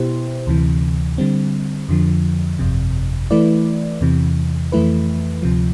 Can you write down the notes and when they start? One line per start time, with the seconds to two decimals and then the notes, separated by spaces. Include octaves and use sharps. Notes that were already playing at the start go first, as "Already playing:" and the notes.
Already playing: B2 B3 E4 G4 C5
0.47 D2 C3 E3
1.18 D3 G3 C4
1.89 F2 D3 F3
2.59 G1 F2 C3
3.31 E3 A3 E4 B4 D5
4.01 E2 C3 E3
4.72 F2 E3 A3 E4 B4
5.43 D2 C3 F3